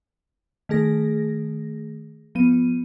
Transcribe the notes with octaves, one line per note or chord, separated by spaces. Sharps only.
D#3 A3 G#4 A#6
F3 B3 D#7